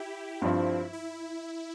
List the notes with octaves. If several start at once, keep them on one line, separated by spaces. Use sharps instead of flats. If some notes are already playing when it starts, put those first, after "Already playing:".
Already playing: E4 G4
G2 F3 C4
E4